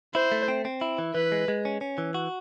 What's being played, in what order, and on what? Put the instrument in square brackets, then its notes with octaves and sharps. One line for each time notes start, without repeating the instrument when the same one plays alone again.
[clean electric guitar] E4 [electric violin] C5
[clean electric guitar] A3
C4
C4
E4
E3
[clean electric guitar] E3 [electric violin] B4
[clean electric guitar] G#3
G#3
C#4
C#4
E3
F#4